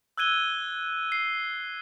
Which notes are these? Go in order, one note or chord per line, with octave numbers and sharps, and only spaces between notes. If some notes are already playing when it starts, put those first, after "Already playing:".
E6 F#6 G#6 D#7 G7
C7